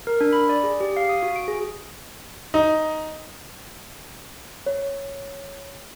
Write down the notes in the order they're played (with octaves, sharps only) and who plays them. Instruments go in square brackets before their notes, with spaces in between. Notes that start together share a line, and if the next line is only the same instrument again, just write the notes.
[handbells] A#4
D4
B5
D5
G#4
G4
F5
D#6
F#4
D7
G#4
[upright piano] D#4
[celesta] C#5